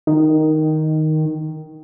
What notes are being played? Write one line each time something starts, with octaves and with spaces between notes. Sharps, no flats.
D#3